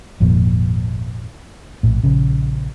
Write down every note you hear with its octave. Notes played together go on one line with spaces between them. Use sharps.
G#1 F2 A#2 F3
A#1 A2
A#1 C#3